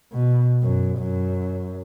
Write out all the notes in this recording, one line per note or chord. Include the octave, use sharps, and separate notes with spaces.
B2
F#2
F#2